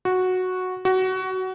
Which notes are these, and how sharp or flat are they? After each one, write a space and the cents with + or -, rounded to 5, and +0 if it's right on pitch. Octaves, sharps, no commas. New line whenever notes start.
F#4 -5
F#4 +20